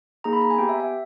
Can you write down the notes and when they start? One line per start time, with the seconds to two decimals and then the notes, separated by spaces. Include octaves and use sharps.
0.24 A#3 D#4 G#4 A#5
0.33 B5
0.41 A#5
0.50 G#5
0.58 B3 G4 G5
0.69 E5
0.80 E5